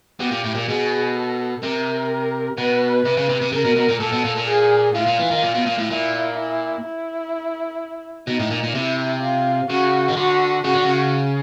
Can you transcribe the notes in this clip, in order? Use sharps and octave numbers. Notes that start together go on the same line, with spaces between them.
B2 G4
A#2
A2
A#2
B2 G#4
A4
C3 A#4
B2 B4
C3
C#3
C3
C3
C#3 A#4
B2
B2
A#2
A#2 A4
B2
A#2
A#2
G#4
A2 F4
A#2
E3
D#3
A#2
B2
A#2
A2
A#2 E4
E4
E4
B2 D#4
A2
A#2
A#2
C3 E4
F4
C#3 F#4
D#3
D3 F#4
C#3 F#4
D3
C#3